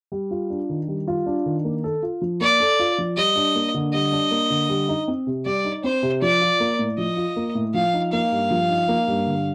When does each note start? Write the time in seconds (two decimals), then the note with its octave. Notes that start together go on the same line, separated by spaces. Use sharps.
0.12 G3
0.31 F4
0.50 D4
0.69 D#3
0.88 G3
1.07 F4
1.26 D4
1.46 D#3
1.65 A#3
1.84 A4
2.02 F4
2.21 F3
2.41 A#3 D5
2.60 A4
2.79 F4
2.98 F3
3.17 G3 D#5
3.36 D4
3.55 A#3
3.74 D3
3.93 G3 D#5
4.12 D4
4.31 A#3
4.50 D3
4.69 G3
4.89 D#4
5.08 C4
5.27 C3
5.46 G3 D5
5.65 D#4
5.84 C4 C5
6.03 C3
6.22 F3 D5
6.41 F4
6.60 A#3
6.79 A2
6.98 F3 D#5
7.17 F4
7.36 A#3
7.55 A2
7.74 F3 F5
7.93 D#4
8.12 A#3 F5
8.32 G2
8.51 F3
8.70 D#4
8.88 A#3
9.08 G2
9.26 D3